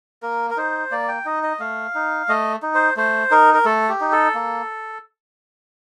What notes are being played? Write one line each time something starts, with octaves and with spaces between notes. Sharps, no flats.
A#3 A#4
A#4
D#4 C5
A#3 D5
G5
D#4 D#5
D#5
A3 F5
D#4
A3 D#5
D#4
C5
A3 C5
D#4 A#4
A#4
A3 A4
G4
D#4
A4
A#3